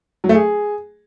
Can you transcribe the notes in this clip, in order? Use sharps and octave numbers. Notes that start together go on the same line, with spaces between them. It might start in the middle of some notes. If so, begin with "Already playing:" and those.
F#3
A3
G#4